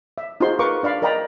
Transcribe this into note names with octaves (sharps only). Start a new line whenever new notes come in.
E5
D#4 F4 F#4 G#4 C5 C6
A#4 B4 F5 A#5 C#6 D6
D4 D5 F5 B5
A#4 D5 D#5 G5 A#5 B5